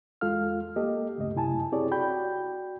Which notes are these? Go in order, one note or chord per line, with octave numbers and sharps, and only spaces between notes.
E2 G#3 F4 A4 F5 F6
A#3 G4 A4 D#5
C#2 G2 C#3 A3 D#5
F#2 C3 E4 G#5 A5
C4 E4 G4 G#4 C#5 D5
F#4 D5 G5 B5 G6